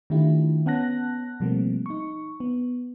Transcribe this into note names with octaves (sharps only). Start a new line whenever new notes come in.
D#3 A3 D4 E4 F4 G4
B3 C#4 F#5 A5 F#6 A#6
B2 F3 G3 A3 A#3 C4
D#4 C#6
B3